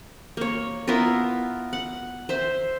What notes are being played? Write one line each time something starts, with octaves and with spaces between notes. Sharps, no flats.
A#3 C#5
B3 E4 F4 A#4
F#5
C5 E5